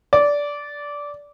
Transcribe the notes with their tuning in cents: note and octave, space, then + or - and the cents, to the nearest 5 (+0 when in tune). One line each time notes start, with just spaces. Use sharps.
D5 -15